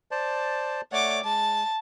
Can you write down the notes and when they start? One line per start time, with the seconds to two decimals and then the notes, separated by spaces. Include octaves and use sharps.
0.11 C5 D5 A5
0.92 A3 C#5 D5 F#5 D6
1.24 G#3 A5